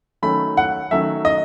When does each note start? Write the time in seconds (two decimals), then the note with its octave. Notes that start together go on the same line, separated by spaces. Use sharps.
0.22 D#3 F#3 A3 C#4 B5
0.57 F#5
0.91 D#3 F#3 A3 C#4 E5
1.25 D#5